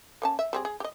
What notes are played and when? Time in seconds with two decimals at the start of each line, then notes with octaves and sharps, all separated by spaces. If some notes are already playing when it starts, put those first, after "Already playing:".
0.22 A#3 C#4 A5
0.39 E5
0.53 G3 C4 G#4
0.65 G#4
0.80 G4 D#5